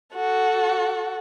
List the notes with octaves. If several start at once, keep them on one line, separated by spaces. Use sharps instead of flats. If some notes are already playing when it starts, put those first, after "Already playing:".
F#4 A4